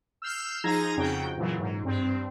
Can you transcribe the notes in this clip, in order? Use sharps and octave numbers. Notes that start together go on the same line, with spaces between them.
E6 F6 G6 C7
F3 D#4 G#4 A#5 G#6 A#6
F2 C#3 F#4 G5
A#2 C#3 E3 F#3
G#2
G2 C4